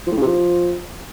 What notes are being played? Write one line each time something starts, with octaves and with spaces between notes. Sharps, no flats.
F3
A2
C#3
C3
F3